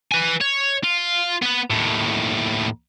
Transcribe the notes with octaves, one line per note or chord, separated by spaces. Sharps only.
B4 G#5
C#5
F4
B3 B4
D#2 A2